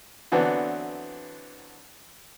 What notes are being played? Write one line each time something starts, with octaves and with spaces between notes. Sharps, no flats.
D3 E3 F#3 B3 C4 D4